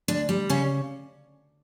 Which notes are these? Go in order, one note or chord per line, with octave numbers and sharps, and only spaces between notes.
D2 D4
G3
C#3 C#4